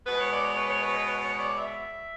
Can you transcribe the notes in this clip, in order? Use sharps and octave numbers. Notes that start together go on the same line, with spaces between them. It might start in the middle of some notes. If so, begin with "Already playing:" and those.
B2 G#3 B4
C#5
D5
C#5
B4
C#5
B4
B4
C#5
C#5
D5
E5